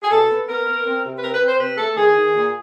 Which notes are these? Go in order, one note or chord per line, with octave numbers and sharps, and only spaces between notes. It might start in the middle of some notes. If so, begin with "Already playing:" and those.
G#4
B2 A4
B3
B3 A#4
B3
C4
C3
B4
C4 A#4
B4
C4
C5
C3 B4
A3 A4
D#3 G#4
D#3
A#2